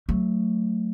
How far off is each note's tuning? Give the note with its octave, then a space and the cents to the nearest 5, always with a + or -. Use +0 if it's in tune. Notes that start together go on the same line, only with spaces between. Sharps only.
F#3 +0 A3 +15